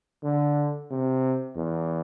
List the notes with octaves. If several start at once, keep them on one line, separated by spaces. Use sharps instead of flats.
D3
C3
E2